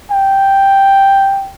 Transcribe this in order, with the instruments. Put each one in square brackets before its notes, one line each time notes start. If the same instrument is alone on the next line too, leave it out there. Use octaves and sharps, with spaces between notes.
[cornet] G5